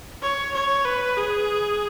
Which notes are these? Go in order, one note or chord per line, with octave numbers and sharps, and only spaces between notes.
C#5
C#5
B4
G#4